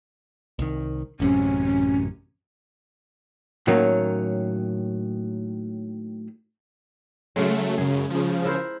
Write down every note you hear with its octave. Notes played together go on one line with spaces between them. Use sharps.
C2 D#3
A1 F#2 C3 C#4
A2 D#3 F#3 A#3 C#4
C#3 F#3 G#3 A3
F#2 C#3 G#4
C#3 F3
E4 A#4 C5